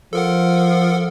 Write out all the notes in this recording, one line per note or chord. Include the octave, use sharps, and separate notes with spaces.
F3 A4 A#4 F#5